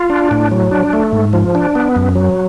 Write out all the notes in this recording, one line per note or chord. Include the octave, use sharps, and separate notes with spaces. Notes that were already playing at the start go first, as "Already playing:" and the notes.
Already playing: F4
D4
A2
F#3
D4
A3
G#2
F3
D4
B3
F#2
F#3